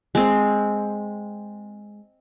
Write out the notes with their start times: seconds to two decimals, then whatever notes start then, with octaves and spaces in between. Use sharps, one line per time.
0.15 G#3 C4